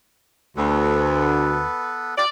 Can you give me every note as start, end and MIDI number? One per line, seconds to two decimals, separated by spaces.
0.57 1.65 38
0.57 2.15 59
0.57 2.15 69
0.57 2.15 71
2.17 2.25 65
2.17 2.25 67
2.17 2.29 74